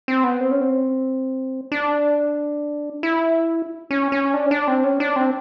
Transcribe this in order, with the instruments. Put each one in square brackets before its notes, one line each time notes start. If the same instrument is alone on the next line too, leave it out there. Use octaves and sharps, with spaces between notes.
[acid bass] C4
B3
C4
C#4
C4
D4
E4
C#4
C#4
D4
C#4
D4
C4
C#4
D4
C4